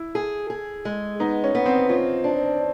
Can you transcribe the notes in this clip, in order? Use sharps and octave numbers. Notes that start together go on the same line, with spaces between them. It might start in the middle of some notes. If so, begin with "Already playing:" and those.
Already playing: E4
G#4
G#4
G#3
B3 D#4
C#4
B3
C4
C#4 F4
D4